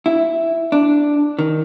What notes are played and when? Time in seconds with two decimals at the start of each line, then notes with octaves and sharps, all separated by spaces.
0.06 E4
0.72 D4
1.39 D#3